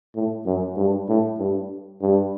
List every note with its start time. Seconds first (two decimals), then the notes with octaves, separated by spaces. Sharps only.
0.15 A2
0.46 F#2
0.77 G2
1.09 A2
1.39 G2
2.01 G2